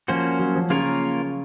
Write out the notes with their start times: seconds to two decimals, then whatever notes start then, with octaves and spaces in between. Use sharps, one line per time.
0.08 F3 A#3 C#4 F#4 C5
0.39 F#3
0.55 F3
0.70 C#3 A#3 F4 A#4 C#5